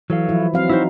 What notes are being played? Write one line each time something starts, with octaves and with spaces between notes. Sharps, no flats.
E3 F#3 A4 F5
E3 F3 E4
F#3 C4 F5
D#4 E4 F#4 C5 F5